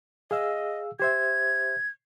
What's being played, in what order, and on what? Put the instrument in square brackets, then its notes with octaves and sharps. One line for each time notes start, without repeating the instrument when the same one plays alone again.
[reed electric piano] G#4 F5 E6 [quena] D#5
[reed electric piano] G4 C5 E5 [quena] G#6